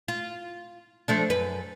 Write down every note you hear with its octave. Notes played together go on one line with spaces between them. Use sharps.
F4
F3 A3 D4
F#2 B4